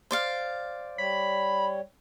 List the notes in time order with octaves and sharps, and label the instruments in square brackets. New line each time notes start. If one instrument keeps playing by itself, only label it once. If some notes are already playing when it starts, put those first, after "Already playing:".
[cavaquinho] C5 D5 F5
[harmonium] G3 C#5 [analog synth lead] B5